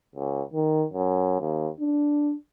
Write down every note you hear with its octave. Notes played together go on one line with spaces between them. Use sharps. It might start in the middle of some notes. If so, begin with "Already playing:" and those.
C#2
D#3
F#2
D#2
D4